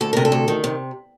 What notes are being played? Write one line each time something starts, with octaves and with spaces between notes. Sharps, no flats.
D2 A4
C3 A#4
A4
D2
D#3
C3